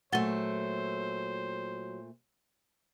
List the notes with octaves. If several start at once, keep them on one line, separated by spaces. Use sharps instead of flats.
A#2 F#3 A3 C5 F#5 A6 G7